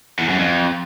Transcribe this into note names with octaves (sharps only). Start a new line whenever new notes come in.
E2
F#2
F2